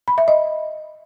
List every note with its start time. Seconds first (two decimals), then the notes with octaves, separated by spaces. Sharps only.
0.08 B5
0.18 E5
0.28 D#5